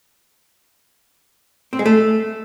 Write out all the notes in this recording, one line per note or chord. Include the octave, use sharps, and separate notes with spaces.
C4
G#3
A3